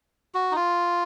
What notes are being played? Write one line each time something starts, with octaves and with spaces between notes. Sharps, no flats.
F#4
D#4
F4